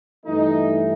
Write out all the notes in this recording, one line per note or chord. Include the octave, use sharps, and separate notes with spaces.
G2 E3 A3 D#4